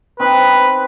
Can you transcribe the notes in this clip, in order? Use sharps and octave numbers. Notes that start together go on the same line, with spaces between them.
C4 D#4 B4